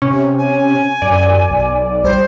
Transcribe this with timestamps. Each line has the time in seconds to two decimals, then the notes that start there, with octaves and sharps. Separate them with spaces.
0.02 C3 C#4
0.38 G#5
1.02 F#2 D5
1.50 B1
2.04 G3 C5